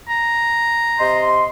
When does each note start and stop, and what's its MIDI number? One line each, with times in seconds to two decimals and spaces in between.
0.09 1.29 82
0.99 1.48 48
0.99 1.48 75
0.99 1.48 84